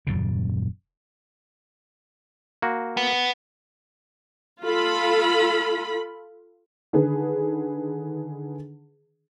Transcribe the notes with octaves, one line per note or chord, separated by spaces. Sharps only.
D#1 F#2 A#2 C#3
A#3 F#4
B3
F4 A4 B5
D3 D#3 G#4 B4